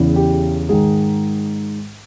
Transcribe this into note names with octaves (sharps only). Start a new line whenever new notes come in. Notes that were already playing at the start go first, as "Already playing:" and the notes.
Already playing: E2 C#3 E3
G4
G#2 D#3 G#4